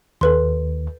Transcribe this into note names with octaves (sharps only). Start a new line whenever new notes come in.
D#2 A4 B4 C6